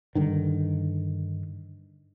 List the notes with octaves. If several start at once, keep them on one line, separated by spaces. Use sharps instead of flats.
G2 D3 D#3